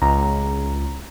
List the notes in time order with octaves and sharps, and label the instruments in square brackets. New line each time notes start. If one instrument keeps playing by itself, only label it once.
[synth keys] C#2 [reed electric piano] A#5